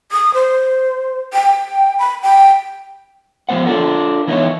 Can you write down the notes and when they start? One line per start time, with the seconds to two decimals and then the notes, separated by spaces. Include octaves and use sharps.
0.12 D#6
0.34 C5
1.33 G5
1.99 B5
2.22 G5
3.49 F3 G3 B3 C5 F#5
3.66 D4 F4 A4 A#4
4.27 E3 B3 D#4 E4 B4 C#5